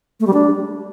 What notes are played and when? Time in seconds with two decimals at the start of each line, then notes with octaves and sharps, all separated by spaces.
0.20 A3
0.27 G3
0.34 D4